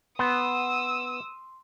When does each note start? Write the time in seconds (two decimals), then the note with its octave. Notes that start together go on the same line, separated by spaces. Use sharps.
0.19 B3 C6 D#6 E6